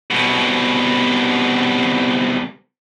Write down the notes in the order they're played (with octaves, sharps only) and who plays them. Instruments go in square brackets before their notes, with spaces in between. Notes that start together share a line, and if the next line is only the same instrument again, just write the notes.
[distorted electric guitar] C2 B2